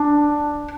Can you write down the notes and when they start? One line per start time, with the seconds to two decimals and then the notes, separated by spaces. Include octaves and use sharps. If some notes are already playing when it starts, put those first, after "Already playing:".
Already playing: D4